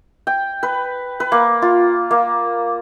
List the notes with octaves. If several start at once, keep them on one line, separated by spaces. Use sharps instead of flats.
G5
B4
B4
A#3
F4
A#3